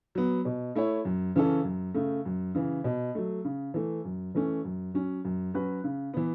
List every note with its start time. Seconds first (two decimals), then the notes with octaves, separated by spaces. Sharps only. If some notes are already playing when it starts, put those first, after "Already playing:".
0.15 F#3 B3
0.45 B2
0.75 A3 E4 C#5
1.05 F#2
1.36 C#3 E3 C#4 A4
1.64 F#2
1.94 C#3 A3
2.25 F#2
2.55 C#3 E3
2.84 B2
3.15 F#3 A3
3.45 C#3
3.74 E3 A3
4.05 F#2
4.35 E3 A3 C#4
4.65 F#2
4.94 F#3 C#4
5.25 F#2
5.54 F#3 C#4 F#4 B4
5.84 C#3
6.14 E3 B3